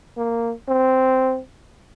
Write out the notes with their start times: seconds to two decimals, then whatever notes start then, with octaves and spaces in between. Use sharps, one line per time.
0.17 A#3
0.68 C4